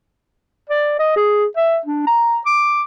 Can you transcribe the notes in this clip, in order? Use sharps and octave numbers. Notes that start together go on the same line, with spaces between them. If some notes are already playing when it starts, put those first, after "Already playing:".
D5
D#5
G#4
E5
D4
A#5
D6